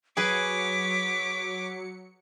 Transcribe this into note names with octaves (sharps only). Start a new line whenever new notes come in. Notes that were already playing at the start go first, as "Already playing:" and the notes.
F#3 G#4 B4 C#5 D6 B6 C#7